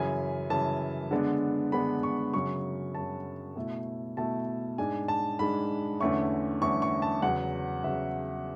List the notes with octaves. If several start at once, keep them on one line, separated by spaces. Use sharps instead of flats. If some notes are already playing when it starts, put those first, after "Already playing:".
Already playing: F#2 C#3 E3 G#5
F#2 C#3 E3 A5
D3 G#3 B3 D4
D3 G#3 B3 D4 B5
C#6
F#2 C#3 F#3 C#6
F#2 C#3 F#3 A5
B2 A3 E4
B2 A3 E4 A5
G#2 G#3 D4 G#5
A5
G#2 G#3 D4 B5
E2 D3 A3 C#4 E4 C#6
E2 D3 A3 C#4 E4 C#6
C#6
A5
E2 C#3 F#3 F#5
E2 C#3 F#3 E5